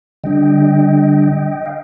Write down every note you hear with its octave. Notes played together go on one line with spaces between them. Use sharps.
D3 G3 D4 D#5 G5
F5